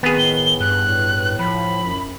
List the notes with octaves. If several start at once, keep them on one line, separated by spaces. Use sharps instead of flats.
D#3 B3 C4 G#4
A2 G7
G2 F#6
A2
F3 B5
F#2